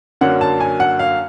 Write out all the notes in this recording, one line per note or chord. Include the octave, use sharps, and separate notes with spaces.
F#2 D3 F#3 A#3 F#5
A5
G#5
F#5
F5